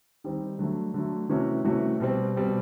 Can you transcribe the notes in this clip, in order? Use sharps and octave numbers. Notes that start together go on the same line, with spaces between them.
D#3 G3 C4 D#4
D3 F#3 A3
D3 F#3 A3
C3 E3 A3 C#4 F#4
C3 E3 A3 C#4 F#4
B2 G3 C4
B2 G3 C4